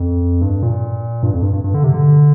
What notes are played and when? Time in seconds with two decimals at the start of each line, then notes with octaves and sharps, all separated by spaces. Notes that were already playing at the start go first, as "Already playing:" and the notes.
Already playing: F2
0.41 G2
0.62 A#2
1.23 G2
1.34 F2
1.43 G2
1.53 G2
1.64 G2
1.74 D3
1.84 C3
1.94 D3